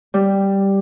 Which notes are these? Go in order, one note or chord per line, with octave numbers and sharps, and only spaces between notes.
G3